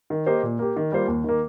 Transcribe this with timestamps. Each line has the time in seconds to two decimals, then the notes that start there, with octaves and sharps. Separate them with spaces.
0.10 D#3
0.26 A#3 G4 C5 D#5
0.43 A#2
0.59 A#3 G4
0.76 D#3
0.92 G3 A#3 F4 C5
1.08 D#2
1.24 D#3 A#3